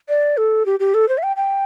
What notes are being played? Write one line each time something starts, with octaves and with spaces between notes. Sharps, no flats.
D5
A4
G4
G4
A4
C5
E5
G5
G5